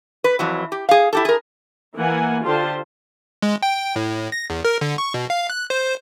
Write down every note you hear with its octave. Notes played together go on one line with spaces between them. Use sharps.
B4
F2 E3 F#3
G4
G#4 F5
E4 G4 A4
G#4 A#4
E3 A#3 F#5 G#5
D3 F4 G4 C5 A5 C6
G#3
G5
A2
A#6
E2
A#4
D3
C#6
B2
F5
F#6
C5